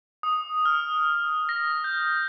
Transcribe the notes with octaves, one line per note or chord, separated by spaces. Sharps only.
D#6
F6
A#6
G6